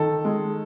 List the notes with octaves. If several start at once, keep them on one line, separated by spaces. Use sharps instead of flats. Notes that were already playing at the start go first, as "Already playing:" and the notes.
Already playing: D#3 A4
G#3